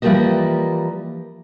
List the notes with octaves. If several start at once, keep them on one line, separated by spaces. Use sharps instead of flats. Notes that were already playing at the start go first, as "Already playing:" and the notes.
E3 F3 G3 G#3 A#3 D#5